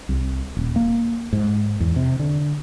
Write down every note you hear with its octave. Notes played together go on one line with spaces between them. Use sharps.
C2
D#1
A#3
G#2
E2
C3
D3